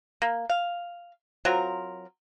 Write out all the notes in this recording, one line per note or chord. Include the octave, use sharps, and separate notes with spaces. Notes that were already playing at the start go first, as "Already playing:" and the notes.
A#3
F5
F#3 C4 F4 A#4